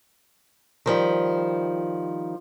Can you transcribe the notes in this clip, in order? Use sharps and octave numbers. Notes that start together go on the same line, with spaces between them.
D#3 F3 G3